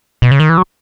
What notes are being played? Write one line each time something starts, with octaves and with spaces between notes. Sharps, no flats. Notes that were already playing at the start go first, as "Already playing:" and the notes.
B2
C#3
D#3
E3
F#3